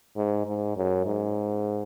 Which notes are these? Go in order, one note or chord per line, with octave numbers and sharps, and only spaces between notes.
G#2
G#2
F#2
G#2